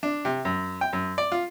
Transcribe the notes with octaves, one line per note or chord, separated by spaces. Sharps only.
D4
C3
F#2
G5
F#2
D5
F4